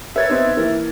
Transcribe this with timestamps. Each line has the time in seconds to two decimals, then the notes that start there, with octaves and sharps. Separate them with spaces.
0.16 A#4 B4 C#5 E5 G#6 A6
0.29 B3 C4 D#4
0.57 E3 A#3 A#4